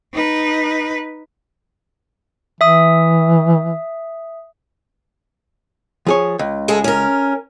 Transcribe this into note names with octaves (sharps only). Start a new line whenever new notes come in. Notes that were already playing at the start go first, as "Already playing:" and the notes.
D#4 B4
E3 E5 D#6
F3 G#4 C#5
C#2
G#3 G#4 A4
C#4 A#4